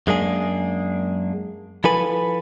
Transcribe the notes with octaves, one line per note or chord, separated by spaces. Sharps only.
F#2 G#3 A#3 D4 G#4
F3 E4 A4 B4 G#5 B5